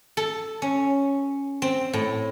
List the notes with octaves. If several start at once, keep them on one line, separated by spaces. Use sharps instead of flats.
A4
C#4
C4
A2